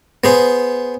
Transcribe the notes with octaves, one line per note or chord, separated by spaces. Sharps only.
B3 G#4 C5